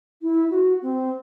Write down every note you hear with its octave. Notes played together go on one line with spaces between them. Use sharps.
E4
F#4
C4